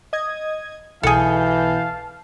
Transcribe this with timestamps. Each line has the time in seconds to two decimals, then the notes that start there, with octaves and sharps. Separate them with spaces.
0.13 D#5 D#6 G#6
1.03 B1 B2 E3 G#4 A4 F5 A5 G6